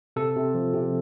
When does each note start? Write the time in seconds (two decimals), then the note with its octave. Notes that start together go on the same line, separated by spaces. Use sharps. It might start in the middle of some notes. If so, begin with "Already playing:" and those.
0.16 C3 A4
0.36 C3
0.54 F3
0.74 C3